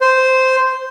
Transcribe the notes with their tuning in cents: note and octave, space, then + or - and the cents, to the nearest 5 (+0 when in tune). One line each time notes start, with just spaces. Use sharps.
C5 -5